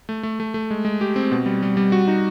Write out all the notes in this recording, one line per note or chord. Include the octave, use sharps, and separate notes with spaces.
A3
A3
A3
A3
G#3
G#3
G4
C4
B2
G3
G3
G3
F#4
D#4